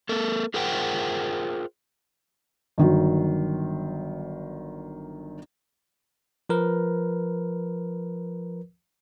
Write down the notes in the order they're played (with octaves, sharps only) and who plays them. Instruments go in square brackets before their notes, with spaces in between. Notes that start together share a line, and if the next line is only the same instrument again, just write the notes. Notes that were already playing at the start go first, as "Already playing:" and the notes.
[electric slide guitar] A#3 A4 A#4
F4 G#4 A#4 C5 F#5 G5
[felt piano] G1 D#3 F#3
[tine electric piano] F3 A#4 B4